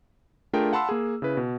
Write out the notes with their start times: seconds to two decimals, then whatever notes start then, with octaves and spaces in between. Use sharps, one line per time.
0.53 A3 D4 F4 G#4 A#4 G5
0.72 F5 F#5 A5 B5 C6 E6
0.89 A#3 G#4
1.22 C#3 E4 B4
1.37 B2